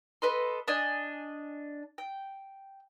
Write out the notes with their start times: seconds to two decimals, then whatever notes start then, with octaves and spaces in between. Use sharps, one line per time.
0.22 A4 B4 D#5 C6
0.68 D4 D#5 G#5
1.98 G5